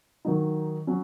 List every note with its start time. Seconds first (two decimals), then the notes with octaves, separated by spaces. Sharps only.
0.25 D#3 F#3 D#4
0.87 F#3 C#4